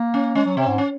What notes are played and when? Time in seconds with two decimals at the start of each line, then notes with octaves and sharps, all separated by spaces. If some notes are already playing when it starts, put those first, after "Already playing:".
Already playing: A#3
0.14 C#4
0.35 G#3 C#4
0.46 F#3
0.57 C3 C4
0.67 G#2
0.78 C#4